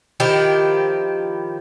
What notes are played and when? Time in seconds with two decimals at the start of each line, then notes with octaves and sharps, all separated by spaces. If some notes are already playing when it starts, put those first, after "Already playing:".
0.20 D#3 F3 E4 G4